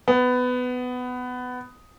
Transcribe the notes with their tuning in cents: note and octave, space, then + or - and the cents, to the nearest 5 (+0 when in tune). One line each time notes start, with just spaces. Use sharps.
B3 +15